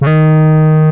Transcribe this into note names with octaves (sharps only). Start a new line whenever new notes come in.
C#3
D#3